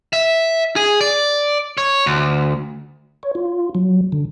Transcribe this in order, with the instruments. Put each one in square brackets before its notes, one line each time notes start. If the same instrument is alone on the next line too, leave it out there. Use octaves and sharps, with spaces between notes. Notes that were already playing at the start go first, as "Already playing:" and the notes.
[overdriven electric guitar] E5
G#4
D5
C#5
D2
[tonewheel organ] C#5
F4
F#3
D3